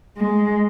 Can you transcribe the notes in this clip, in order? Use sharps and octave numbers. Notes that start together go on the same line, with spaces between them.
G#3